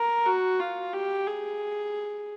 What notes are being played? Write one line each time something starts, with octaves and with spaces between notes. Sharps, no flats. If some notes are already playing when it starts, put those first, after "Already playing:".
Already playing: A#4
F#4
F4
G4
G#4